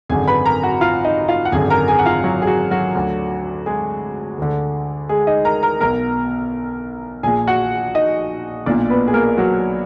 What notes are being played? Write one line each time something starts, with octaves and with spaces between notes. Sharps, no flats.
G#1 F#2 D3 G#4 G#5
B4 B5
A#4 A#5
F#4 F#5
F4 F5
D#4 D#5
F4 F5
F#5
G#1 F#2 D3 G#4 G#5
A#4 A#5
G#4 G#5
F#5
F4 F5
F#3 F#4
G#4
F#3 F#4
F#3 F#4
D2 D3
G#3 G#4
D2 D3
G#3 G#4
D#4 D#5
A#4 A#5
A#4 A#5
B1 B2 A#4 A#5
A#1 A#2 G#4 G#5
F#4 F#5
D#4 D#5
B1 A#2 D4 D5
B3 B4
G#4
A#3 A#4
F#3 F#4